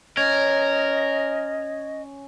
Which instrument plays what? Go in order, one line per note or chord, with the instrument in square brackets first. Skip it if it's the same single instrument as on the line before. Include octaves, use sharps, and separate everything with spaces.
[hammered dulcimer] C#4 [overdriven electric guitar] A#4 [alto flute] D#5 [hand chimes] G#6